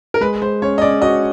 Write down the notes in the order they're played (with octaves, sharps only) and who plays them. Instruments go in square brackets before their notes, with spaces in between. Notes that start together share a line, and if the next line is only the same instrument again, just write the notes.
[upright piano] A#4
[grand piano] G#3 [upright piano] B4
[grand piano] G#3 [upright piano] C5
[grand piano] C#4 [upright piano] C#5
[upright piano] D#5
[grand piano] C#4 [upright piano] D5
[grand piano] F#4 [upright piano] D#5